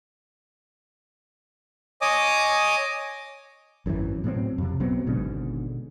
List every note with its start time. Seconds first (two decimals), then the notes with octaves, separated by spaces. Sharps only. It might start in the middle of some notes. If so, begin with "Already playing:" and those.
2.01 C#5 D#5 G#5 D6 D#6
3.86 G#1 F#2 D3 E3
4.24 A2 F#3 G#3 C4
4.58 F2 C3
4.80 B1 F#3 B3 C4
5.06 G#1 G#2 B2 D3